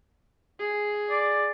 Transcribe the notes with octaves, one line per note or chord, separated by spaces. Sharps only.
G#4
D5